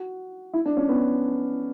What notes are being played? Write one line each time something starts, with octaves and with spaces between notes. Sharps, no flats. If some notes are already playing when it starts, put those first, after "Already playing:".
Already playing: F#4
E4
D4
C#4
B3